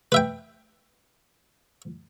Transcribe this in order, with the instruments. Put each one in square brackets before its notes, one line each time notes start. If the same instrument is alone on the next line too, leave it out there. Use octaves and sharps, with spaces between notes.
[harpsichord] B4 E5 G5